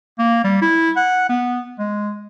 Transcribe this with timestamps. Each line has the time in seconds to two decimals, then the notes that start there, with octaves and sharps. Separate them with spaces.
0.19 A#3
0.44 G3
0.62 E4
0.96 F#5
1.29 B3
1.79 G#3